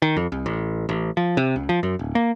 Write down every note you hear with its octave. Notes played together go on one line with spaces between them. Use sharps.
D#3
F2
C2
A1
A1
F3
C3
C#2
F3
F#2
D1
A#3